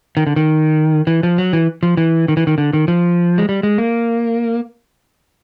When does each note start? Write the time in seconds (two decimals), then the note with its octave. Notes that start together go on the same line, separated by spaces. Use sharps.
0.17 D#3
0.27 D3
0.36 D#3
1.07 E3
1.23 F3
1.38 F#3
1.53 E3
1.83 F3
1.97 E3
2.28 D#3
2.37 E3
2.47 D#3
2.58 D3
2.73 D#3
2.88 F3
3.38 G#3
3.49 G3
3.63 G#3
3.78 A#3